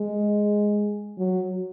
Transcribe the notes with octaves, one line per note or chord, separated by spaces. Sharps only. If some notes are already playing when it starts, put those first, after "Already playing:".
Already playing: G#3
F#3